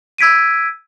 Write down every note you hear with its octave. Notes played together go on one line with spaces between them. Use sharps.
E6 G#6 B6 D7 D#7